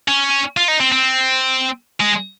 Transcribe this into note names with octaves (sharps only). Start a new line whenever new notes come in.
C#4
F4
D#4
C4
C4
G#3